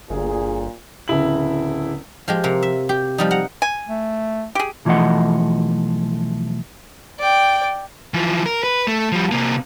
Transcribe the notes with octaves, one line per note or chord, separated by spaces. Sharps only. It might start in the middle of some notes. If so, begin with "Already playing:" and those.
G1 D2 G2 A#2 G#4
D1 C#3 E4 F#7
F3 G#3 G4
C3 A#3
E5
G4
F3 G3 D#4
F#5 A#5
G#5
A3
G4 G#4
B1 E3 F3 A3 D#5 F#5
D5 G5
E3 F3
A#4
B4
A3
F3 G3
C3 A#3